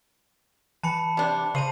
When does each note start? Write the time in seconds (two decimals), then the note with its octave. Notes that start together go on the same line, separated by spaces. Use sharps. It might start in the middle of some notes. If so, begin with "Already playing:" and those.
0.83 E3 A5 B5 C#7
1.17 C3 D4
1.55 C#3 C5 A5 A#5 D#7 F#7